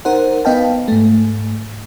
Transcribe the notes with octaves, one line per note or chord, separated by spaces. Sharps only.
D#4 A#4 C5 F#5
B3 B4 D#5 F5 G5 A5
G#2 A3